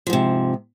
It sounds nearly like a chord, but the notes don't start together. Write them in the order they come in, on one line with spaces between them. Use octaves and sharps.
F3 G#2 C3